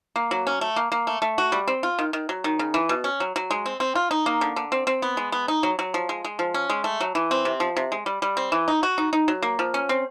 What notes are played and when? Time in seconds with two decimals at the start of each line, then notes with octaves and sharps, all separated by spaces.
0.16 A#3
0.31 F#3
0.47 C#4
0.61 A3
0.76 A#3
0.92 A#3
1.07 A3
1.22 A3
1.38 F#4
1.52 G3
1.68 C4
1.83 F4
1.99 D#3
2.13 D#3
2.29 F#3
2.44 D#3
2.59 C#3
2.74 E3
2.89 B2
3.04 C#4
3.20 F#3
3.36 F#3
3.51 G#3
3.66 C4
3.80 C4
3.95 F4
4.11 D#4
4.26 A#3
4.41 D3
4.56 D3
4.72 C4
4.87 C4
5.02 B3
5.17 G#3
5.32 B3
5.48 D#4
5.63 F#3
5.79 F#3
5.94 F3
6.09 G#3
6.25 G#3
6.39 F3
6.54 C#4
6.70 G#3
6.84 A3
7.01 F#3
7.15 E3
7.31 C4
7.45 C3
7.60 F3
7.77 C3
7.92 G#3
8.06 G3
8.22 G3
8.37 C4
8.52 E3
8.68 D#4
8.83 F#4
8.98 D#4
9.13 D#4
9.28 F#3
9.43 A#3
9.59 F3
9.74 C#4
9.89 C4